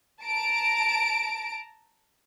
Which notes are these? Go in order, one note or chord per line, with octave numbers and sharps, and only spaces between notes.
A5 A#5 D7